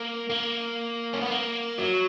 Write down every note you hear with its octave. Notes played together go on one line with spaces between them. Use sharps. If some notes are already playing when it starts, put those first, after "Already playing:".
Already playing: A#3
A#3
C#4
B3
A#3
F#3